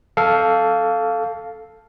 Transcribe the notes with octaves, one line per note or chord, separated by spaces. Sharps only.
A4 F5